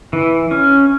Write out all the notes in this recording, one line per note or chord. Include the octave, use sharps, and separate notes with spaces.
E3
C#4